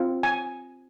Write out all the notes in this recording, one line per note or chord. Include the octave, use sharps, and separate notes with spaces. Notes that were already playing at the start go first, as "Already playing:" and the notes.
Already playing: C4 F4
G#5